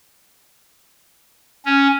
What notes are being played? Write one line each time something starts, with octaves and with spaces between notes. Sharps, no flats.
C#4